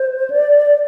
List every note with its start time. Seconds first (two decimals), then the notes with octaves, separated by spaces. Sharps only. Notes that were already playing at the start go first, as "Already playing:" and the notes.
Already playing: C5
0.30 D5